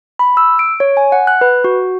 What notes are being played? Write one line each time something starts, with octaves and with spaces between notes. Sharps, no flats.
B5
E6
D7
C#5
G#5
F#5
F#6
B4
F#4